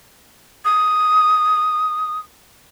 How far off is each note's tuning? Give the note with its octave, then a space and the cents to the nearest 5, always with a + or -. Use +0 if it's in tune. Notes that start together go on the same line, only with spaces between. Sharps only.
D#6 +5